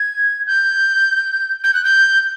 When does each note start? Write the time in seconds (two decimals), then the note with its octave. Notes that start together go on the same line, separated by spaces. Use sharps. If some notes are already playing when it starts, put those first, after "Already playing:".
Already playing: G#6
0.47 G6
1.63 G6
1.74 F#6
1.84 G6